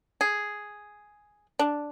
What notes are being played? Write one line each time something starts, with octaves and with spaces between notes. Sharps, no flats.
G#4
D4